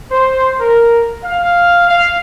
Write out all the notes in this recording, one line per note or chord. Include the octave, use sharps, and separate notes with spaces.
C5
A#4
F5
F5